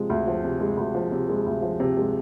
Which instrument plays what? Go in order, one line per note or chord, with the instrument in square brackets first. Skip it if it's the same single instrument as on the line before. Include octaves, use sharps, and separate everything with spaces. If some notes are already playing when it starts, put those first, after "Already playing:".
Already playing: [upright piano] C3 F3 G#3
D2
F3
C3
G#3
D2
F3
C3
G#3
D2
F3
C3
G#3